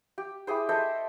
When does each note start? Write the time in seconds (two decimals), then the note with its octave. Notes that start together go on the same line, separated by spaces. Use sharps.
0.18 G4
0.47 E4 G4 G#4 C5
0.69 A4 C5 D#5 E5